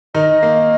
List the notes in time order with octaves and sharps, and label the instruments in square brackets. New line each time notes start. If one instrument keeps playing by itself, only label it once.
[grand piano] D#3 D#4 [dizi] D#5
[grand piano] A#3